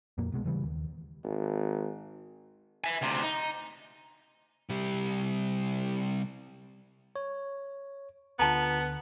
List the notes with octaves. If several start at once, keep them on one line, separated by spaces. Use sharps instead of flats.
F2 A#2 A#3
C2 B2 G#3
E2 C#3 E3 G3
D#2
G#1
E5 G#5
D2 C3
D#4
C3 G3
C#5
D2 D3 B3 F4 A5 A#5